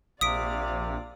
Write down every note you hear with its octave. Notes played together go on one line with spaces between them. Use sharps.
A#1 C3 D5 F5 D#6 B6 D7